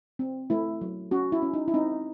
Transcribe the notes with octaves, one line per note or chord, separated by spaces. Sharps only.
C4
A3 E4
F#3
C#4 F#4
E4
C#4
D#4
E4
C4 D#4